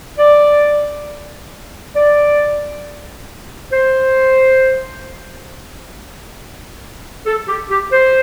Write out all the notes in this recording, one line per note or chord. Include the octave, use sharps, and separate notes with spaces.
D5
D5
C5
A4
G4
G4
C5